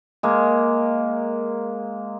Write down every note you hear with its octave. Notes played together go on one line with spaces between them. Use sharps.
G#3 A#3